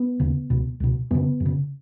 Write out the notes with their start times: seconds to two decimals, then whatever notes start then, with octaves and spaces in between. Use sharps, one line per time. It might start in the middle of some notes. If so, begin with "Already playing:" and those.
Already playing: B3
0.20 D#2 C#3
0.50 C#2 B2
0.80 C#2 B2
1.11 F#2 C#3 B3
1.40 F#2
1.46 C#3